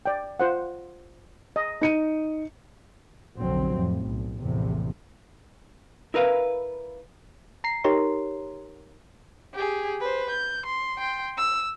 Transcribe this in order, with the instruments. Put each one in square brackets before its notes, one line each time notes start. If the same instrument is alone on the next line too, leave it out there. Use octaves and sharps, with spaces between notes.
[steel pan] D5 G5
F4 C5 F#5
D#5
[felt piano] D#4 C#7 D#7
[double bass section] F1 B1 D3 F#3 C4
F2 A2
B1
A#1 E2 A2 C3
[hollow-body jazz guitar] E4 A#4 B4 F5
[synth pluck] A#5 C7
D#4 G4 A#4 C#5 A#5 C6
[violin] G4 G#4
B4 C5
G6
C6
G5 C6
E6